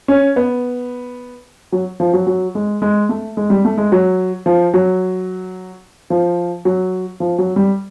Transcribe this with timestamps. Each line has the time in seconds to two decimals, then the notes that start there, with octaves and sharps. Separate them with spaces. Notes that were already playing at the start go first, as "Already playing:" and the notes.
0.08 C#4
0.36 B3
1.72 F#3
2.00 F3
2.13 F#3
2.27 F#3
2.55 G#3
2.82 G#3
3.09 A3
3.37 G#3
3.50 G3
3.65 A3
3.78 G#3
3.92 F#3
4.46 F3
4.74 F#3
6.10 F3
6.65 F#3
7.20 F3
7.38 F#3
7.56 G3